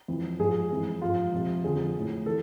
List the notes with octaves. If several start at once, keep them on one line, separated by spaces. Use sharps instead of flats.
F2 E3
G#2 F3 G#4
F2 E3
G#2 F3 F4
F2 C3 F3
F2 D3 F3 G#4
A2 F3
E3 A4